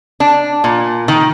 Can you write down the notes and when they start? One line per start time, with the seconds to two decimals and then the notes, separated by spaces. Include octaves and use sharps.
0.20 D4
0.64 A#2
1.08 D#3